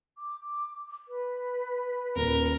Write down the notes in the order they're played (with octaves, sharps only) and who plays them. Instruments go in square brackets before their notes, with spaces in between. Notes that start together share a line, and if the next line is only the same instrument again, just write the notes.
[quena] D6
B4
[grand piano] D#1 [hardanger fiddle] A#4